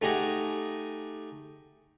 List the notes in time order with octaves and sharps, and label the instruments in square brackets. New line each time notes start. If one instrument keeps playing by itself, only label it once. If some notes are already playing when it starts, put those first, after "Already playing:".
[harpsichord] A3 D#4 G4 G#4 D#5 F#5